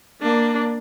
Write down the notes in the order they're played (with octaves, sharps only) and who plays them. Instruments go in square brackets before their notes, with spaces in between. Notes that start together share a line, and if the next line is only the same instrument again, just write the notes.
[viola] A#3 D4